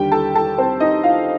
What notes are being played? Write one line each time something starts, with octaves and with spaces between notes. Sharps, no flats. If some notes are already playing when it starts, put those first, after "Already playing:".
Already playing: D#2 D3 G3 G4 G5
A4 A5
A4 A5
C4 C5
D#4 D#5
F4 F5